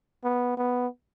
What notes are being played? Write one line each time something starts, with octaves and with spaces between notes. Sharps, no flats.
B3
B3